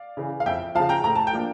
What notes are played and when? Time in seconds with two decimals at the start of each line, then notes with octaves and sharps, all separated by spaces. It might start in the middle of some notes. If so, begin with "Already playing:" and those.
Already playing: D5 F5
0.17 C#3 E3
0.40 F5
0.46 F2 E5 G5
0.75 C#3 F3 F5 A5
0.89 G5 A#5
1.04 A2 A#5
1.15 A5
1.27 G5
1.33 F3 A#3 D4